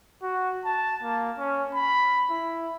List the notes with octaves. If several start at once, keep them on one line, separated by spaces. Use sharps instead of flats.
F#4
A5
A#3
C#4
B5
E4